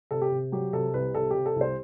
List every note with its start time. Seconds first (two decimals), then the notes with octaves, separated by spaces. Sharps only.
0.11 C3 A4
0.22 G4
0.31 C3
0.52 F#3 G4
0.73 C3 A4
0.94 C2 B4
1.14 C3 A4
1.31 C3 G4
1.46 A4
1.56 C2
1.61 C5